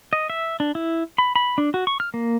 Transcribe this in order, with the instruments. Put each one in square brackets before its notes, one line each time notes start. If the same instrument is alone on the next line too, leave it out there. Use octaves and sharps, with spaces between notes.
[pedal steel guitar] D#5
E5
D4
E4
B5
B5
D4
F#4
C#6
F6
A#3